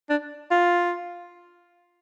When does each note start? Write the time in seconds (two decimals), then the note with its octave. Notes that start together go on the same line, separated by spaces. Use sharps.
0.10 D4
0.51 F4